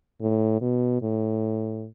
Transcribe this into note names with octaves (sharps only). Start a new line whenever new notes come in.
A2
B2
A2